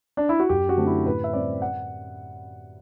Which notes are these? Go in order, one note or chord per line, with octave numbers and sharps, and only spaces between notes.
D4
E4
F#4
F#2 G4
F#4
D3 A3 C4
E4
A2 B4
E5
G3 C4 D5
F#5